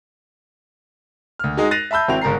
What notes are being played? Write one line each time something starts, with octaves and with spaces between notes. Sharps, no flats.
D2 F6
G#3 D#4 F#4
F#6 A6 A#6 C7 D#7 F7
E5 A5 B5 E6 G6
G#1 C4 E4 F#4 G5 F7
G1 G#2 A#4 A#5 C7